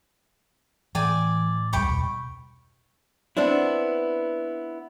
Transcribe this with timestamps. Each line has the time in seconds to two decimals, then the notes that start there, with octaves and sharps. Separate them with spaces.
0.95 A2 E3 D5 G5 G#5
1.73 E1 C#2 G3 G5 B5 C#6
1.89 E2 B2
3.37 B3 C4 D4 E4